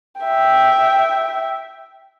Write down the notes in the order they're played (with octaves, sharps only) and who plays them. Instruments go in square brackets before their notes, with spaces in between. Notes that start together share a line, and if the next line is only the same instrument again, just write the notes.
[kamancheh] E5 G5